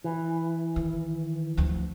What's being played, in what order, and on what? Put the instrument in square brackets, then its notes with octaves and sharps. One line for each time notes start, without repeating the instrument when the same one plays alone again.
[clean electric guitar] E3
[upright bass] D#3
D2 F3